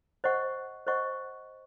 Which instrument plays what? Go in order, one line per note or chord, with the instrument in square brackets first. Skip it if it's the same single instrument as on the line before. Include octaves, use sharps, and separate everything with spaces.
[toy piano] C5 D#5 F#5 C#6
C5 D#5 F#5 C#6